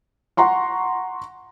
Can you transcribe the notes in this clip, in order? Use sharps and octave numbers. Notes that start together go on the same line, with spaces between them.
F#5 A#5 C6 C#6